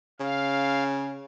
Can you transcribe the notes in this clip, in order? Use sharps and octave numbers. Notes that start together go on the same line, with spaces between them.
C#3 F5